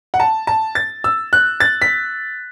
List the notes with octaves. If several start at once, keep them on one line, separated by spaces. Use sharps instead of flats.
F#5
A5
A5
A6
E6
F#6
A6
B6